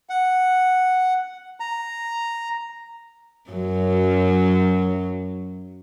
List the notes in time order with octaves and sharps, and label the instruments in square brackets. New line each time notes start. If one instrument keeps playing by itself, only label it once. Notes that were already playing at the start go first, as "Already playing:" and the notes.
[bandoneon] F#5
A#5
[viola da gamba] F#2 F#3